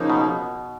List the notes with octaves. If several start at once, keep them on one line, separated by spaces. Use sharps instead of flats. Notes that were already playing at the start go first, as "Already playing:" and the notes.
Already playing: C#3 F3 A#3 D#4
B2